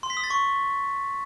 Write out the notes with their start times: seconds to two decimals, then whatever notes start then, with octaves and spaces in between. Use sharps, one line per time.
0.03 C6
0.10 B6
0.17 D#6
0.24 A6
0.30 C#6